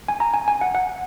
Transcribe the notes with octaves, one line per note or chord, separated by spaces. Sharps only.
G#5
A#5
G#5
G#5
F#5
F#5